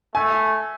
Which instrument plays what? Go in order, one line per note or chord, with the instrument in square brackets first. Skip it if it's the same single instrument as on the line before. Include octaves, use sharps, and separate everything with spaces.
[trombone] A3 [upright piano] G#5